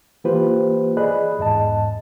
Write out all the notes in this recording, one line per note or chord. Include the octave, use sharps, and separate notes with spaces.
E3 A#3 F4 G4 B4 C5
G#4 D5 D#5 B5 F#6
E2 G#2 D#5 A5